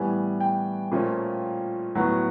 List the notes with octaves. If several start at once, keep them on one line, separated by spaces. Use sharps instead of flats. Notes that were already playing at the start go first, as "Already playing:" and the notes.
Already playing: A2 E3 G3 B3 G#5
G5
A#2 F3 A3 C#4
A2 F#3 B3